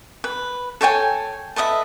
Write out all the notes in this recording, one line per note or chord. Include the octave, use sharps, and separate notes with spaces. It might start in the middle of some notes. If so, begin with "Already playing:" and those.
B4
A4 C#5 G5 G#5
A4 B4 D#5 E5